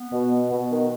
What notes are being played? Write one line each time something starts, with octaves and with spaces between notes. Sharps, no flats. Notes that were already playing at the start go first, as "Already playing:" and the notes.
Already playing: B3
B2
B3
B2
D#3